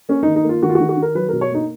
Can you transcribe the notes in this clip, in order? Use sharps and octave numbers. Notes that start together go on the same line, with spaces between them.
A#3 C#4
D#4
D#3
D#4
A#3 F4
D#3 F#4
F4
F#4
D#3
F#4
D#3 A#4
F#3 B4
B2 A#4
C#5
A#3 D#4